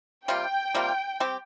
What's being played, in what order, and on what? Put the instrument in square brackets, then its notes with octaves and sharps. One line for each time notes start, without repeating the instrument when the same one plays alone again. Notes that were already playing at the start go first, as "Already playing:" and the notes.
[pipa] C3 G3 A#3 F4 [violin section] G5
[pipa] C3 G3 A#3 F4
G3 C4 G4